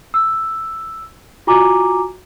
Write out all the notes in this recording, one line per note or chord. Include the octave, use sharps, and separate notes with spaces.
E6
F4 F#4 G#5 A#5 D6